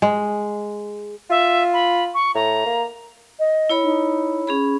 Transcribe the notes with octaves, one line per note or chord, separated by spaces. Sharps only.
G#3
F4 E5
B5
C#6
A2 A#5
A#3
D#5
E4 C#5 B5
D#4
C#4 G#4 B5